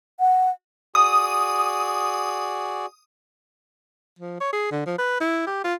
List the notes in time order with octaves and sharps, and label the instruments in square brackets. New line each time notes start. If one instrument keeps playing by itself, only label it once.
[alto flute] F#5
[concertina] F#4 G#4 D5 [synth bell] D#6
[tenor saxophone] F3
C#5
G#4
D3
F3
B4
E4
G4
F4